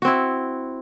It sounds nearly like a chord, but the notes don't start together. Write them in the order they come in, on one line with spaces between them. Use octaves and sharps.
F#4 C4 E4